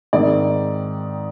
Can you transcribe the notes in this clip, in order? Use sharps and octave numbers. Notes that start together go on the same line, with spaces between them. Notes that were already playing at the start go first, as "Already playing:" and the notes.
G#2 D#3 G#3 C4 D#4 D5